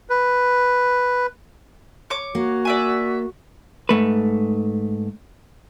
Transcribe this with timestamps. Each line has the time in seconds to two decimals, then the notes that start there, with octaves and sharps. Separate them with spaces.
0.10 B4
2.10 C#5 D6
2.35 A#3 F#4
2.65 D5 E5 G#5
3.89 G#2 A3 B4